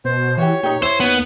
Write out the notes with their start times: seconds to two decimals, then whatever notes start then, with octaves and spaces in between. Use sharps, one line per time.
0.05 B2 C5
0.37 E3 F#4 G4 C#5
0.63 A#2 D#4 G4
0.82 D#2 E4 C5
1.00 B3